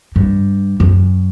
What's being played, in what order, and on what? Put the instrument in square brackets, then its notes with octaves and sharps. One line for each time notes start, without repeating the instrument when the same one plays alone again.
[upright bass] G2
F#2